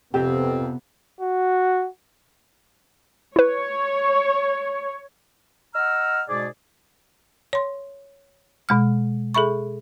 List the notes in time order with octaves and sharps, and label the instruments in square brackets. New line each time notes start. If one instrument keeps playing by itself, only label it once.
[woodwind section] F2 C4 [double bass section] C3 B3 [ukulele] G4
[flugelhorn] F#4
[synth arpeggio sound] E4 B4 [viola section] C#5
[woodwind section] D#5 F#5 A#5 E6 F6
G#2 B2 G#3 G#4 D5
[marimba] C#5 C6
B2 G#3 F6
G#4 A4 E5 B5 C#6